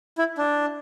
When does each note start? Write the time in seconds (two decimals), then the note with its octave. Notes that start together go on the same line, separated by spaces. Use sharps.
0.18 E4
0.38 D4